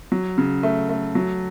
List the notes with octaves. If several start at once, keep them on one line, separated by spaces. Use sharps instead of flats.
F#3
C#3
A3
A3
F#3